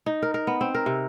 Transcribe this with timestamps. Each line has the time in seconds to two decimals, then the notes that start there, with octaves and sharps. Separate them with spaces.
0.06 D#4
0.22 A#4
0.34 A#4
0.47 B3
0.61 C4
0.75 A#4
0.86 C3